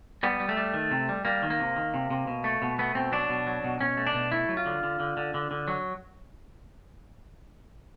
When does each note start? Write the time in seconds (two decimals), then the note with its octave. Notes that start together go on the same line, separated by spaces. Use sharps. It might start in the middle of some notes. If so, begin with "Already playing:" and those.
0.23 G3 B3
0.40 G3
0.49 A3
0.57 G3
0.74 D#3
0.91 C3
1.09 G3
1.25 G3 A#3
1.43 D#3
1.50 A#3
1.60 C3
1.76 D#3
1.94 C3
2.10 C3
2.27 B2
2.44 A3
2.62 B2
2.78 A3 B3
2.95 B2 C4
3.12 F#3 D4
3.30 B2
3.47 F#3
3.64 B2
3.81 B2 C#4
3.97 A3
4.07 D4
4.14 B2
4.32 A3 E4
4.49 F#3
4.57 F4
4.66 D3
4.83 D3
5.00 D3
5.17 D3
5.34 D3
5.51 D3
5.68 F#3